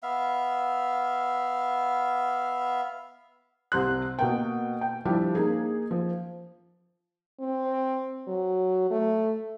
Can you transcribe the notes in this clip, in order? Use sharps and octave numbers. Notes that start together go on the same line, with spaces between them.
B3 E5 F5
C2 C3 C6 F#6
B2 A#3 G5
G5
F3 G3 D4 E4 G4
A#3 D#4 G#4
F3
C4
F#3
A3